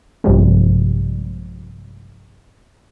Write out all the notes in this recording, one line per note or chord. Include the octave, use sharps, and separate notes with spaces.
A#1 G2 C3 F3 G3 G#3